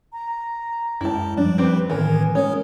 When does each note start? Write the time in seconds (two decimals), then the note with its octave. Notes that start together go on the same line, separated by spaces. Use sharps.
0.13 A#5
1.01 F#2 G#3 E4 A5
1.37 F3 G3 D4
1.58 F#3 C4 G4 B4
1.90 A2 D#3 E3 B3 A#4 G#5
2.35 G#3 C#4 A#4 C#5 D#6